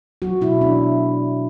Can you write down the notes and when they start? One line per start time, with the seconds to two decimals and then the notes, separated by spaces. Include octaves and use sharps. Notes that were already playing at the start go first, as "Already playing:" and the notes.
0.22 F#3 F#4
0.41 B2 E4
0.61 A3 D4